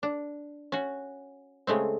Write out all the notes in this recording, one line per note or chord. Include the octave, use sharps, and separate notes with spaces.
D4
C#4 F#4
C#3 G#3 A3 C4